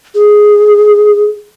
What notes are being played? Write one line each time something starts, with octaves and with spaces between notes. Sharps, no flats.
G#4